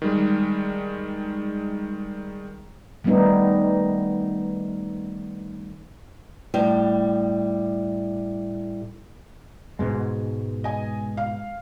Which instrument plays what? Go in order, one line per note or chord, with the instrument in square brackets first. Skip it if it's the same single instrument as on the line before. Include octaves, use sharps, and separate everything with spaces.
[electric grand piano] D#3 G3 G#3
[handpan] D#3 G3 A3 B3 D#4
[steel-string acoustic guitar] A2 G3
[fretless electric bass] G#2 B2 G#3
[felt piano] D#5 G#5
F5